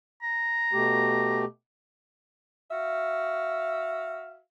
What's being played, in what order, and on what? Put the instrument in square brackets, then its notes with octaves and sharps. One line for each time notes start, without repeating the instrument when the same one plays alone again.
[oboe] A#5
[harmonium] B2 A3 G4
[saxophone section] F#4 E5 F5